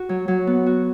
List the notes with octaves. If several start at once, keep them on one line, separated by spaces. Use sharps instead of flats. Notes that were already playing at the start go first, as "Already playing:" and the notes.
Already playing: F#4
F#3
F#3
B3
F#4